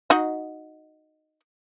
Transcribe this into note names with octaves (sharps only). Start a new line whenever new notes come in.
D#4 F#4 D#5